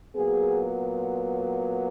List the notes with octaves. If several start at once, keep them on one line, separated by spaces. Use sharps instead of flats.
A#2 F#3 B3 G#4